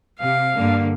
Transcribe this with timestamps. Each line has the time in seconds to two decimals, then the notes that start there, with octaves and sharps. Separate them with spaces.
0.19 C3 F5
0.56 G2 D3 A#3